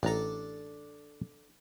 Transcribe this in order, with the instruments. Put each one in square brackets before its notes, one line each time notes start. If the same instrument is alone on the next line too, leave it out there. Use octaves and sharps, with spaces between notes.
[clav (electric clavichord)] A1 A#5 [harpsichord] D4 A4